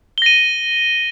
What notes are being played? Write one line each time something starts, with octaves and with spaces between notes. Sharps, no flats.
A#6 D#7 G7